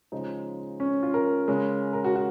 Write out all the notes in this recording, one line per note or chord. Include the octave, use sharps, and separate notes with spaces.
C#3 F3 G#3 D#4
C#4
F4
A#4
C#3 G#3
A#4
F#4
F#4